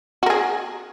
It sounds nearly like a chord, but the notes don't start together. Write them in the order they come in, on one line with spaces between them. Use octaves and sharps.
F#4 A#4 G#4